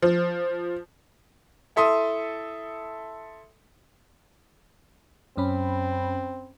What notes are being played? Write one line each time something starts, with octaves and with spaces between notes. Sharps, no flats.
F3
E4 A4 E5 C6 D#6
F#2 C4 C#4 B5